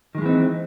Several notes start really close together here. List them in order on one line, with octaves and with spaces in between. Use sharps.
D#3 G#3 E3 C4 D#4